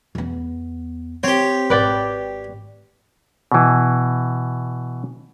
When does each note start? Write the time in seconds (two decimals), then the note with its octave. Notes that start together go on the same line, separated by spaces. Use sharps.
0.15 E2 B3
1.23 C4 G4 C#5
1.70 G#1 B4 D5 G5
3.52 B2 E3